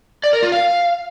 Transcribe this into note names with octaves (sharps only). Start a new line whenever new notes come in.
D5
A#4
F4
F5